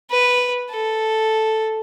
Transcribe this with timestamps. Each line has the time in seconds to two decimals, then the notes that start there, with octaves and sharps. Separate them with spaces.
0.11 B4
0.70 A4